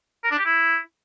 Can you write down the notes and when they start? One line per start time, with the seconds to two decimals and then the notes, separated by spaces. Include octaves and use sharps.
0.24 A#4
0.31 D4
0.38 G4
0.46 E4